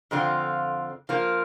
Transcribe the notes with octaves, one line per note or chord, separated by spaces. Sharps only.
F2 D3 F3 C4 F4
F3 A#3 F4